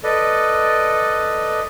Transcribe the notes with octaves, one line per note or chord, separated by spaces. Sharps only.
A4 B4 D5 D#5